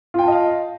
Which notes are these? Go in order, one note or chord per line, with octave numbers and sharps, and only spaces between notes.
F4 D#5 F5 G5 A5